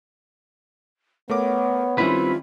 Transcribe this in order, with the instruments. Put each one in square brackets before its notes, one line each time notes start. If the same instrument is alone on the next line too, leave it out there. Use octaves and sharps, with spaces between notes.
[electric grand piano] A3 A#4 D6 [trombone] B3 [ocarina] C#5
[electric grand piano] D#3 C#4 E4 [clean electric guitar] G3 C4 B4 [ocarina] F4